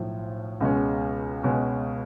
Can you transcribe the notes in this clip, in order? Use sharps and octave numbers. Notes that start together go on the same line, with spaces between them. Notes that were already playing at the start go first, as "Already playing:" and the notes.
Already playing: B1 A2 F3
C#2 B2 G#3 C#4
C#2 B2 G#3 C#4